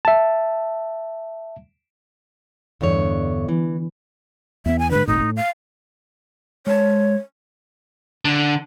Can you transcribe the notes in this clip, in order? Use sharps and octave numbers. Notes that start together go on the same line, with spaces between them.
E5 A5
E2 G2 D3 C#5
E3
E2 B3 E5
G#5
G#2 D3 B4
D#1 G#1 A2 D#4
A2
F5
G#3 C5 C#5 A5
D3